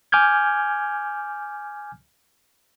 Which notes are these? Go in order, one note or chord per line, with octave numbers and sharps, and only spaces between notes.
G#5 D6 F6 G6 G#6